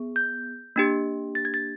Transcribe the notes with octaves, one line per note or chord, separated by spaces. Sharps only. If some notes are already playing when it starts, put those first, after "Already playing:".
Already playing: B3 G#4
G6
A#3 D4 G4
A6
G#6
A6